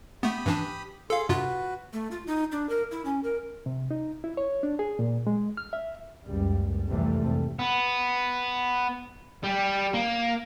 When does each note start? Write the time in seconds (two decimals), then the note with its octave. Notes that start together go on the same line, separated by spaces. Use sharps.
0.23 A3 B3 G4 B5 D#6
0.46 G2 E3 D4
1.10 F4 G#4 A4 F5
1.29 G2 C3 F4 F#4 B4
1.93 A3
2.11 F4
2.27 D#4
2.52 D4
2.69 A#4
2.91 E4
3.05 C#4
3.24 A#4
3.66 C3
3.91 D#4
4.24 E4
4.37 C#5
4.63 D4
4.79 G#4
4.99 A#2
5.27 G#3
5.57 F6
5.73 E5
6.26 F#1 C#2 G3
6.89 F1 G#2 C3 E3 G3 A3
7.59 B3
9.44 G3
9.94 A#3